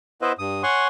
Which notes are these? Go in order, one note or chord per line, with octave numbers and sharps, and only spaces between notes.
B3 E4 B4 C5 D#5 E5
G2 D#6
C#5 F#5 G#5 C6 C#6